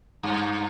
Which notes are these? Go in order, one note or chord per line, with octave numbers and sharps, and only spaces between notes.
G2